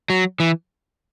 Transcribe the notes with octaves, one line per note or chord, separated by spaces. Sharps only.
F#3
E3